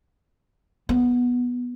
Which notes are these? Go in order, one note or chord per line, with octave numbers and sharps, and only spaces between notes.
B3